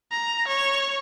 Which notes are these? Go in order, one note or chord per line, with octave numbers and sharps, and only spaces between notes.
A#5
C#5